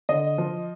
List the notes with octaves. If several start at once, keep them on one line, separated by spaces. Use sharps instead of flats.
D3 D#5
F3